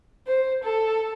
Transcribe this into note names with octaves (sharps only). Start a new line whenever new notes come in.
C5
A4